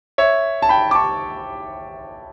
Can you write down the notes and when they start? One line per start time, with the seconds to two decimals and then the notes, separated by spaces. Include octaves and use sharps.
0.18 C#5 E5
0.62 A5
0.69 G5 B5
0.91 D6
0.95 A5 C#6